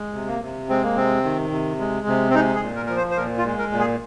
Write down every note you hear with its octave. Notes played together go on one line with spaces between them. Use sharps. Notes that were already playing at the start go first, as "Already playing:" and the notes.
Already playing: G#3
C3
A#3
C3
G#3 C4
A#3
C3 C4
D#3
C3
G#3
C3
C4
G#3 D#4
G#4
A#2
A#4
F3 A#4
C5
C5
A#2 A#4
F4
G#3
A#4
A#2
G#4